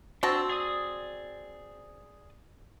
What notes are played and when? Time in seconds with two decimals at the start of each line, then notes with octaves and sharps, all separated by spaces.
0.23 C4 D4 F#4 A5 E6
0.49 G#4 D5 D#6